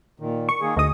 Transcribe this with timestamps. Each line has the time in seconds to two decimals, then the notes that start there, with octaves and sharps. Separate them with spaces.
0.20 A#2 D#3
0.49 C#6
0.61 D#3 A#3 G#4
0.77 D2 D#5 D#6